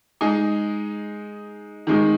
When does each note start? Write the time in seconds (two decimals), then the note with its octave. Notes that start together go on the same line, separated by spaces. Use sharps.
0.21 G#3 D#4 G#4
1.87 D#3 G#3 D#4